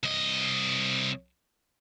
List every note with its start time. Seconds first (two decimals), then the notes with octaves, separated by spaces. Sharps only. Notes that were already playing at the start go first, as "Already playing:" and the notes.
0.03 C2 D#5